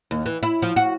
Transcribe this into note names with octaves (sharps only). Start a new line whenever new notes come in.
D#2
E3
E4
F3
F#4